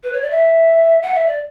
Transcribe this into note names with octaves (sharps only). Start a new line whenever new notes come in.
B4
C#5
D5
E5
F#5
E5
D5